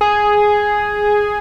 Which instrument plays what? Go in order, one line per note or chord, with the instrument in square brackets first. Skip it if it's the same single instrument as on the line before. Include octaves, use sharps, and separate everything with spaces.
[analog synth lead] G#4